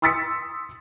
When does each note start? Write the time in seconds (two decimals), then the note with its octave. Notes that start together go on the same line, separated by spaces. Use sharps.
0.02 C6 D#6 E6 A6 B6 C#7